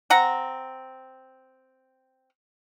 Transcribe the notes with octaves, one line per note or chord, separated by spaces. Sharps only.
C4 F#5 A#5